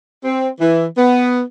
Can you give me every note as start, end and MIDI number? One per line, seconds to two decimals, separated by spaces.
0.24 0.48 60
0.60 0.85 52
0.97 1.41 59